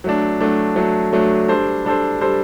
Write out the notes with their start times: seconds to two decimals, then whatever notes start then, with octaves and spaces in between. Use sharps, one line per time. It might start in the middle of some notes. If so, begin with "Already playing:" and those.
0.04 F#3 A3 D4
0.41 F#3 A3 D4
0.76 F#3 A3 D4
1.13 F#3 A3 D4
1.48 G3 D4 A4 C5
1.85 G3 D4 A4 C5
2.21 G3 D4 A4 C5